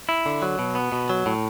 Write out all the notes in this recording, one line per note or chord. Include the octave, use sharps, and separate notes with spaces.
E4
D3
F#3
B2
B3
B2
F#3
A2